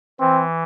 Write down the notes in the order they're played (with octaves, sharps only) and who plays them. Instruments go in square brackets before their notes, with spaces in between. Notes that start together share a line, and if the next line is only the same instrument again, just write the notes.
[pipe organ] E3 [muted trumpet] C4